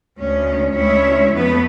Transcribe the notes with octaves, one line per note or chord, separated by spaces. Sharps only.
D2 C#4
D2 G#3 C#4 E4 C#5 E5
F2 A3 B3 B4